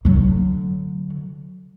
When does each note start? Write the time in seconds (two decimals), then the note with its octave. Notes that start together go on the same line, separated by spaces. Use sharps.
0.05 D3 F#3